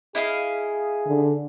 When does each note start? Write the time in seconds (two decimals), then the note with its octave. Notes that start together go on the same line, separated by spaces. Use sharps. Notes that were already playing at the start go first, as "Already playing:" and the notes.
0.15 E4 G#4 D#5 F5
1.07 D3